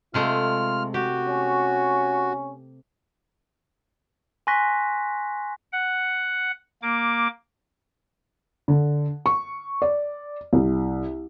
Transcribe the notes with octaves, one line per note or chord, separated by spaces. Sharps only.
C3 G#3 A3 F4 F6
F#4 G4
C#4
G#5 C6 C#6 F#6 A#6 B6
F#5
A#3 D6
D3
C#6
D5
C2